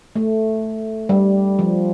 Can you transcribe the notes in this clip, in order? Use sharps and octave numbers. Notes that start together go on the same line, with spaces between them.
A3
G3
F3